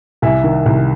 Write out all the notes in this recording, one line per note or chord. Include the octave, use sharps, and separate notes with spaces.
C2 E5 G#5
D#3
C2